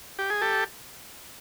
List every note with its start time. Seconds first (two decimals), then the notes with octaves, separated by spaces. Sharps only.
0.19 G4
0.30 G#4
0.41 G4 A4